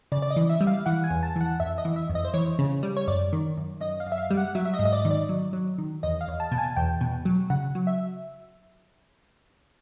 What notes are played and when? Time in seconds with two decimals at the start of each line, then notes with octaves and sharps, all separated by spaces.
0.12 C#3 D5
0.22 D5
0.30 D#5
0.36 E3
0.49 E5
0.61 G3
0.67 F5
0.86 E3 F#5
1.04 G#5
1.10 E2
1.23 A5
1.36 E3 F#5
1.60 F2 E5
1.78 D#5
1.85 E3
1.96 E5
2.10 F2
2.15 D#5
2.25 C5
2.34 E3 C#5
2.59 C#3
2.83 G3
2.97 C#5
3.08 F#2 D5
3.33 D#3
3.57 F#2
3.81 F#2 D#5
4.00 F5
4.06 F#2
4.12 E5
4.18 F5
4.31 G3
4.37 F#5
4.55 F#3 E5
4.65 E5
4.74 D#5
4.79 G#2
4.85 D#5
4.93 D5
5.05 D#3
5.11 D5
5.29 F#3
5.53 F#3
5.78 D#3
6.03 E2 D#5
6.21 F5
6.28 E2
6.40 A5
6.52 B2 A5
6.58 G#5
6.76 E2 G5
7.01 B2
7.25 F#3
7.50 C#3 F#5
7.75 F#3
7.87 E5